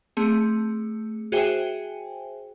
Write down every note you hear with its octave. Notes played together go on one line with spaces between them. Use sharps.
A3 C4 G#4 C#7
F#4 G#4 C5 E5 G5 G#5